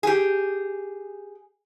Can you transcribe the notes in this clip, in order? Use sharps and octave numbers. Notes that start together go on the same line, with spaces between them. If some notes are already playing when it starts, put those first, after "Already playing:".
G4 G#4